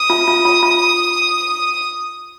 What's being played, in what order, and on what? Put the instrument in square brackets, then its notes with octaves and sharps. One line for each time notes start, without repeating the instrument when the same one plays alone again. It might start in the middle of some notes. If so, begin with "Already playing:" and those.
Already playing: [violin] D#6
[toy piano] F4
F4
F4
F4